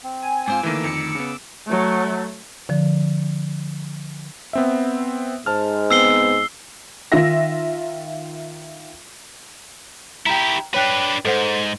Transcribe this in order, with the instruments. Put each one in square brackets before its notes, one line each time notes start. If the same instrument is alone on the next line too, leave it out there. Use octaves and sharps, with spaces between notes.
[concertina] C4
[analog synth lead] G#5
[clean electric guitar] G#2 C4 F4 [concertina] D6 E6
[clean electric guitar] D2 D#3 [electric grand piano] E3 A3 A#3
[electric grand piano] F2 [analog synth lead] C#7
[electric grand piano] C#3 B3
[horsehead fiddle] F#3 A3
[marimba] D3 F3
[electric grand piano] B3 C4 E5
[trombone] G#2 [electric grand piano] C5 A5 F6
[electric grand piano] B3 C4 [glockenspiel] E6 C7 G7
[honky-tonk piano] D#3 F4 E5 A#6
[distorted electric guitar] E4 G4 [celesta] G5 A#5
[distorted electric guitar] D4 B4 [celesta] C#5 G5 F#6
[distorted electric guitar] G#2 [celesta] A4 C5 F#5